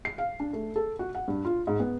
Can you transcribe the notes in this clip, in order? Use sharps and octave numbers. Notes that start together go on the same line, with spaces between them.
C7
F5
D4
A3
A4
F#4
F#5
G2
F4
G#2
B3